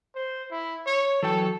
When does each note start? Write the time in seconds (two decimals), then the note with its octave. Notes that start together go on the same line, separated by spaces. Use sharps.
0.15 C5
0.51 E4
0.87 C#5
1.22 E3 F#3 A4 G5